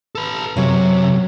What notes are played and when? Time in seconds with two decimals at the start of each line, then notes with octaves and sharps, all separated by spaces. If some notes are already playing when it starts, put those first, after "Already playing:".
0.15 A4 B4
0.57 F#2 C3 F#3